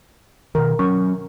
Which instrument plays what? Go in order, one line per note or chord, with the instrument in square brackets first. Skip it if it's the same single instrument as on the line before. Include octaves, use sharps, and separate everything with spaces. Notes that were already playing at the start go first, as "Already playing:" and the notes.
[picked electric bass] B2 D#3 [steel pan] A#4
[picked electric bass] F#3 C#4 [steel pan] C#6